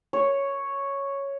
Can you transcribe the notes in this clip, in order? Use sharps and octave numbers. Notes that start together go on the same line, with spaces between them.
C#5